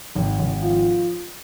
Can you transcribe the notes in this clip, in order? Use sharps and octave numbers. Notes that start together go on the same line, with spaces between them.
G#1
G#1
F3